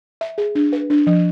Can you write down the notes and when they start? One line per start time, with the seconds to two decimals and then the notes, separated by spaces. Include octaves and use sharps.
0.21 E5
0.38 G#4
0.55 D4
0.73 B4
0.90 D4
1.07 F3